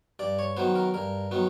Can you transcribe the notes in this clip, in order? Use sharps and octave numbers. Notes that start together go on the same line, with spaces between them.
G2 D5
C#5
D#3 F#3 B3 C5
A#4
G2 A#4
D#3 F#3 B3